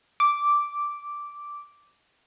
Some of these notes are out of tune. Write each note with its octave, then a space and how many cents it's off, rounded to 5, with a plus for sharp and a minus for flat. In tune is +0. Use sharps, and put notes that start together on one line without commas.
D6 -5